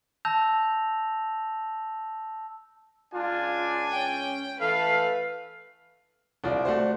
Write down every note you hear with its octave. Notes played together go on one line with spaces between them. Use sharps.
A5 E6 G6 A#6 F7
C#2 D4 F4 G#5
C#4 G5
E3 A3 A4 B4 F5
C2 G#2 D3 F4 D5
A3 F#4 C5